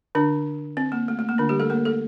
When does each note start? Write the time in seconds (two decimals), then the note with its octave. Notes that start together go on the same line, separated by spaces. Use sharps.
0.15 D3 D4
0.77 C4
0.92 A#3
1.08 A3
1.19 A3
1.29 A#3
1.38 D3 D4
1.49 G3 G4
1.60 A3 A4
1.70 A#3 A#4
1.85 A3 A4